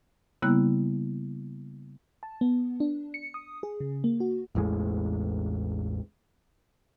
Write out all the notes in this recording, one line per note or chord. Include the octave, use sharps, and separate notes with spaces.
C#3 G3 A#3 B3 E4 F#6
A5
B3
D4
C#7
D#6
G#4
C#3
A#3
F#4
A1 E2 A2 G#3